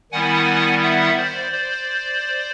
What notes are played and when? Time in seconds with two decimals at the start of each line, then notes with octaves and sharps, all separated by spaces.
0.12 D#3 G3 B3 E4 F#5 G#5
0.82 E5 F#5
1.17 C5 D5
1.51 C5 D5